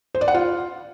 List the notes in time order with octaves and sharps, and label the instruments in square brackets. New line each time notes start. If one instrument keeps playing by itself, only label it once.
[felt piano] C5
D5
F#5
F4